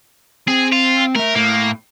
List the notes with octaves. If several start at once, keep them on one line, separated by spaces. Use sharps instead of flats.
C4 G#4
F4
A3 A#4 E5
A2 A#3